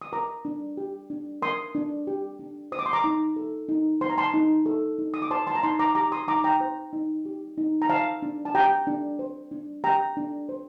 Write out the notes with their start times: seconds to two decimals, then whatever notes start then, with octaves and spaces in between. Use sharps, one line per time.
0.02 D#6
0.12 A#4 A#5 D6
0.45 D4
0.77 G4
1.10 D4
1.42 A#4 C6 D#6
1.75 D4
2.07 G4
2.39 D4
2.72 C5 D#6
2.79 D6
2.86 C6
2.93 A#5 D6
3.04 D#4
3.36 A4
3.69 D#4
4.01 C5 C6
4.10 A#5
4.18 A5 C6
4.34 D#4
4.66 A4
4.99 D#4
5.14 D#6
5.22 D6
5.31 C5 A5 C6
5.47 A5 C6
5.55 A#5
5.63 D#4 A5 C6
5.79 A#5 D6
5.95 G4 A#5 D6
6.12 C6 D#6
6.28 D#4 A#5 D6
6.44 G5 A#5
6.60 C5
6.93 D#4
7.25 G4
7.58 D#4
7.82 A#5
7.89 C5 F5 A5
8.22 D4
8.45 A5
8.55 G4 G5 A#5
8.87 D4
9.19 C5
9.51 D4
9.84 G4 G5 A#5
10.17 D4
10.49 C5